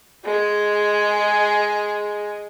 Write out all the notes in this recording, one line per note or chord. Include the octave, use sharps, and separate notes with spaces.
G#3 G#4